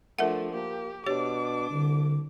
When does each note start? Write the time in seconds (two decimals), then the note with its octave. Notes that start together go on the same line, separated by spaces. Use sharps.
0.19 F3 A3 D4 A#4 E5 F#5
0.52 A#3 G4
1.06 B2 D4 G4 C#5 D6
1.70 C2 D3